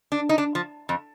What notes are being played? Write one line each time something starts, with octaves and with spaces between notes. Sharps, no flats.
D4
D#4
D4
F3
F2